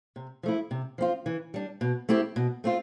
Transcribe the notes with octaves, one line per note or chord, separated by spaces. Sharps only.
C3
F3 A3 E4
C3
F3 C4 F4
E3
G3 D4
B2
A3 C4 E4 G4
B2
A3 C4 F4